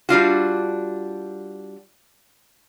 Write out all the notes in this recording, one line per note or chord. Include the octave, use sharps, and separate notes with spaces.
G3 D4 F4 F#4